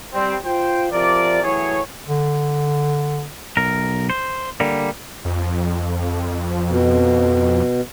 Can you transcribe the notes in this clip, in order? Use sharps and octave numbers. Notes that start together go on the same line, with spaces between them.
G3 C4
F4 C5 G5
C3 F3 A#4 D5
A2 E3 F#3 G#4 C#5
D3
B1 A#4
C5
D3 G3 A#3
F2
B2